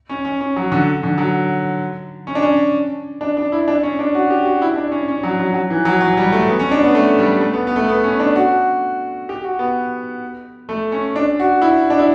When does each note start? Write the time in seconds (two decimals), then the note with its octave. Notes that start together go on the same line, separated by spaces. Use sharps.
0.09 C#4
0.25 C#4
0.41 C#4
0.56 F#3
0.72 D3
1.03 D3
1.18 F#3
2.27 C#4
2.35 D4
2.42 C#4
3.21 D4
3.37 D4
3.52 E4
3.68 D4
3.83 C#4
3.99 D4
4.15 F#4
4.30 G4
4.45 F#4
4.62 E4
4.76 D4
4.92 C#4
5.08 C#4
5.23 F#3
5.39 F#3
5.54 F#3
5.70 E3
5.85 F#3
6.01 F#3
6.17 G3
6.32 A3
6.49 B3
6.59 C#4
6.71 D4
6.83 B3
6.95 A3
7.19 G3
7.41 A3
7.53 B3
7.67 B3
7.76 A3
7.88 B3
8.03 C#4
8.20 D4
8.36 F#4
9.29 G4
9.44 F#4
9.59 B3
10.69 A3
10.92 C#4
11.16 D4
11.39 F#4
11.62 E4
11.90 D4
11.99 E4